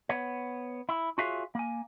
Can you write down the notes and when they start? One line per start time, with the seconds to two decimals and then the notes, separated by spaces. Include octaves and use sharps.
0.09 B3 C#5
0.89 E4
1.18 F4 F#4 G#4 C#5 E5 F5
1.55 A#3 G#5